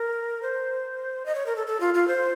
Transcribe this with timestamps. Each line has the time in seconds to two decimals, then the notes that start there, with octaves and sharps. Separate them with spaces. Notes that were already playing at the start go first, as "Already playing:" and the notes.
Already playing: A#4
0.42 C5
1.26 D#5
1.35 C#5
1.46 A#4
1.56 A4
1.67 A4
1.80 F4
1.94 F4
2.08 C5